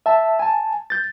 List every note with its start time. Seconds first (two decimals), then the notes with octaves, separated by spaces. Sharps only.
0.06 E5 A5
0.39 G#5 A5
0.90 G6 A6